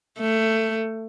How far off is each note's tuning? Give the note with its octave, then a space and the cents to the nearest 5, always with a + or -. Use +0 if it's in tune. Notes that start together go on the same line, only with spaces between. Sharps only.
A3 +15